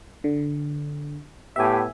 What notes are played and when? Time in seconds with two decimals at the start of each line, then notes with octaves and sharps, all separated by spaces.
0.24 D3
1.56 A2 B3 G4 E5 G#5